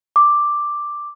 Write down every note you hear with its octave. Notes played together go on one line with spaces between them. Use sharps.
D6